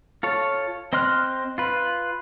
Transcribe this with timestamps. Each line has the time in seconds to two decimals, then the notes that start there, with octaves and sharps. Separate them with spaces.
0.23 F4 A4 C#5
0.93 C4 D#5 C6 F6 F#6
1.58 F4 B4